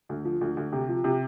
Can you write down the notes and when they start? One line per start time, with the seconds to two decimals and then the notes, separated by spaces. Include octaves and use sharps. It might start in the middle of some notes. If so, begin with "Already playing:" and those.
0.09 D2
0.25 F3
0.41 D2
0.57 D2
0.73 C3
0.89 F3
1.04 C3